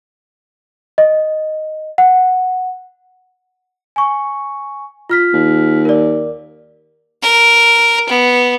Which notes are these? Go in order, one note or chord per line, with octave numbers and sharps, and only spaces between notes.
D#5
F#5
G#5 C#6
F4 F6 B6
D#2
A#4 D5
A#4
B3